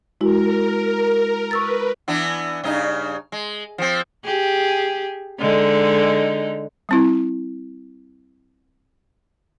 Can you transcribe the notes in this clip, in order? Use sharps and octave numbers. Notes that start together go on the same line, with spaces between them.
G#3 E4 F#4 A#4
B4 C#6 E6 A6
E3 B3 D4
G2 C#3 D#4
G#3
F3 C4
G4 G#4
D3 G#3 D#4
G3 C4 E4